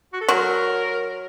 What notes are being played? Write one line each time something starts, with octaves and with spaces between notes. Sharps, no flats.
F#4
A4
F#3 A#4